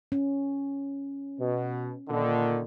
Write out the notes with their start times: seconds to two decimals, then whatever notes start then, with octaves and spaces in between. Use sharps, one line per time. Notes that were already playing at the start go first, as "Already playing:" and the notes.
0.12 C#4
1.39 B2
2.09 A#2 D3 D#3